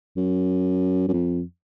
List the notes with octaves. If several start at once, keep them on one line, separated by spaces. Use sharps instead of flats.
F#2
F#2
F2